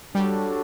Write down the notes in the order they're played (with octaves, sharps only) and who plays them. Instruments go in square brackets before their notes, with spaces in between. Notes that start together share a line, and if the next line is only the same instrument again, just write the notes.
[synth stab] G3 [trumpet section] D4 F#4 A4 C#5